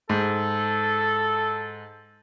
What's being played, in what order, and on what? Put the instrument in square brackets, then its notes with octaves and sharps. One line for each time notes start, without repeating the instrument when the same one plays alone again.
[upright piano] G#2 [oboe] A4